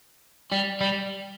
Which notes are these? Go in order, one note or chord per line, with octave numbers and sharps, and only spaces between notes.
G3
G3